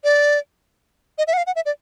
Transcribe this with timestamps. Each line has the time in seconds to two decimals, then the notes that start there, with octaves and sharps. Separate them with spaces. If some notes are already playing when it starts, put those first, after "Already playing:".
0.04 D5
1.18 D#5
1.27 E5
1.33 F#5
1.38 F5
1.47 F#5
1.56 E5
1.66 D5